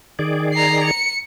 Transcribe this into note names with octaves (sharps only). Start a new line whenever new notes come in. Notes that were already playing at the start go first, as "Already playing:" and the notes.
D#3 G#4 D5
A#5 C7
C#7